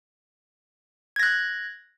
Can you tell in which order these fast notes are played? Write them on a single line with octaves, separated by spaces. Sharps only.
G#6 A#6 F#6